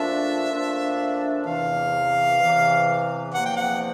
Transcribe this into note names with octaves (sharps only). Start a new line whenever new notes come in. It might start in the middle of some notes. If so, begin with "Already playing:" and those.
Already playing: A#2 F3 A3 D4 F4 E5
A#2 F3 A3 D4 F4
E2 C3 E3 F5
E2 C3 E3
E2 C3 F3 A#3 F#5
G5
F#5